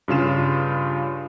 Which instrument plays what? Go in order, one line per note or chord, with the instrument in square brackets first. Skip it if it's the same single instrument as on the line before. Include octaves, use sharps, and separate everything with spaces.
[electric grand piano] G2 C#3 F4 E7